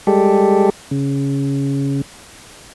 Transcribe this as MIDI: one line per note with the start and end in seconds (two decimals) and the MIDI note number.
0.07 0.70 55
0.07 0.70 56
0.07 0.70 67
0.07 0.70 69
0.91 2.01 49